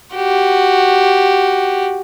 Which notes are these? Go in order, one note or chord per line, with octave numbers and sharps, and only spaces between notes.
F#4 G4